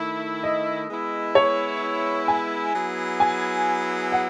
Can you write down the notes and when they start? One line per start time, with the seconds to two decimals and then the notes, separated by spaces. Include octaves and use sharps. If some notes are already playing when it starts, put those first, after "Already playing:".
Already playing: D#3 A3 E4
0.43 D#5
0.89 G#3 B3 E4
1.35 C#5
2.28 G#5
2.75 F#3 B3 E4 G#4
3.20 G#5
4.12 F#5